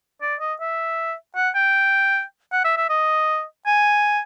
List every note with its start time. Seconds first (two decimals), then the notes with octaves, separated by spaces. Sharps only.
0.22 D5
0.40 D#5
0.60 E5
1.36 F#5
1.55 G5
2.52 F#5
2.64 E5
2.77 E5
2.89 D#5
3.66 G#5